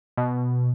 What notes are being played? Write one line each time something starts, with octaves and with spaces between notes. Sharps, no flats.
B2